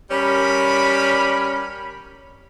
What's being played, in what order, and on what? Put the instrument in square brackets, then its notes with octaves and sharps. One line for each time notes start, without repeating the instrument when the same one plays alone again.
[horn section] G3 C#4 A#4 B5